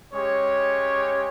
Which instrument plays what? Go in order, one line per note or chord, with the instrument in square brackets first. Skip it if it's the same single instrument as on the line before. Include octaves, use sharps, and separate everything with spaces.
[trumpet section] G#3 C#4 G4 C#5